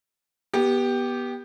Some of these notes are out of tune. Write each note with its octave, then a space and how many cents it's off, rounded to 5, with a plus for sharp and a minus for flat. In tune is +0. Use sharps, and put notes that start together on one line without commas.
B3 -20 G4 +0